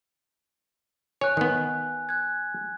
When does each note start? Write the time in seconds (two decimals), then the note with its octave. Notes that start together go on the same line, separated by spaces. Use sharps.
1.21 C#5 G#5 F#6
1.37 D#3 B3
2.09 F#6 G#6